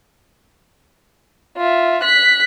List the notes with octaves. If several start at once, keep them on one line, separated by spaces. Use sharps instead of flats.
F4 E5
F#6 B6